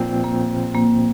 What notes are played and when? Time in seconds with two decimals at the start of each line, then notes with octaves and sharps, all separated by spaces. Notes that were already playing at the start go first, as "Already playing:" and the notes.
Already playing: A#2 F3 C4
0.24 A#3
0.74 A#3